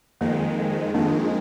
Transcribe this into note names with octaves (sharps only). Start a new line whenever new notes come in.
F2 D#3 G#3 A#3
F2 D#3 G#3 A#3 D4